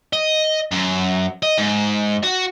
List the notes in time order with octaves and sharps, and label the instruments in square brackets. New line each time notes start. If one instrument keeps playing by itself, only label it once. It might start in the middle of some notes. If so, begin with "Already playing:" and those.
[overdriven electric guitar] D#5
F#2
D#5
G#2
F#4